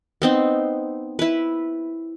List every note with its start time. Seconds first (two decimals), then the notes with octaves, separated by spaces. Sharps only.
0.22 B3 C4 D#4
1.19 E4 B4